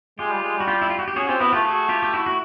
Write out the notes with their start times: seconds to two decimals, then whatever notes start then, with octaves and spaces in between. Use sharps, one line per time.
0.19 G#3 F4 G4
0.31 G3
0.43 G#3
0.56 G3 F#4
0.68 F4 G4
0.82 E4
0.90 F4
0.99 F#4
1.08 G4
1.16 C#4 F#4 G#4
1.29 C4 F4 G4
1.40 B3 E4 F#4
1.53 A3 F4 G4
1.64 F#4 G#4
1.89 F4 G4
2.03 G4
2.14 E4 F#4
2.26 F#4